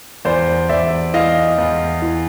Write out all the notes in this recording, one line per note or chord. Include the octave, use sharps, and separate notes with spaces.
E2 C5 D5
E2 D5 E5
E3 D#5 F5
E2
E3